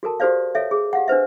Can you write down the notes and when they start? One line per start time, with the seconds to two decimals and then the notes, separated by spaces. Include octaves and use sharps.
0.03 F#4 A4 A#4 A5
0.20 F#4 G4 A4 C5 D5 F5
0.55 A4 C#5 E5 F5
0.71 G#4
0.93 G4 F5 F#5
1.08 D4 B4 C5 E5